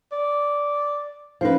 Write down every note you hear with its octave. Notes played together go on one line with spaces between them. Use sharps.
D5
F3 C#4 D#4 B4 F5